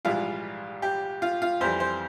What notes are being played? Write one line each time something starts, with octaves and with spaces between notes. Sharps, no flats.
A#1 G#2 E3 G3 F4
G4
F4
F4
F2 E3 G3 C5
C5